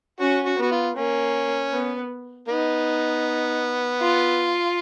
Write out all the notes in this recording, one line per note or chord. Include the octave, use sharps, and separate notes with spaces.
C#4 F#4
F#4
B3 F#4
F4
A#3 C#4
B3
B3 D#4
F4